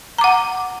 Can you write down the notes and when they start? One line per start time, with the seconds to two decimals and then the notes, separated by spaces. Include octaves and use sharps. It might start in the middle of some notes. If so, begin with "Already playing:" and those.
0.18 A#5
0.21 D6
0.24 F#5